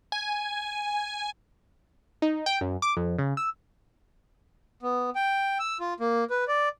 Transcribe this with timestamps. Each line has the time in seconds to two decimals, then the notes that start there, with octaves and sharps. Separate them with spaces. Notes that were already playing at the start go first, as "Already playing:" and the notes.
0.12 G#5
2.22 D#4
2.46 G5
2.61 F#2
2.82 D6
2.97 F2
3.18 C#3
3.37 E6
4.82 B3
5.15 G5
5.59 E6
5.80 F4
6.00 A#3
6.30 B4
6.48 D5